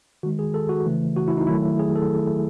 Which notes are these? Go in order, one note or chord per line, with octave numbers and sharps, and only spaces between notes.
D#3 G#3 F#4
G#4
A4
F#4
C#3 E3 A3
F#4
E4
D#4
D#3 F#3 A3 E4
G#4
A4